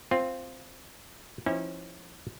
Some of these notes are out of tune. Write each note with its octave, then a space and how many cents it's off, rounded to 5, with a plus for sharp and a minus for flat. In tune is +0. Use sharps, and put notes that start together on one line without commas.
C4 +0 F4 +0
F3 -30 C#4 -35 E4 -45